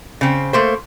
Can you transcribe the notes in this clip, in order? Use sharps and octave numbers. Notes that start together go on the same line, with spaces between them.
C#3 C4
A3 A#3 C5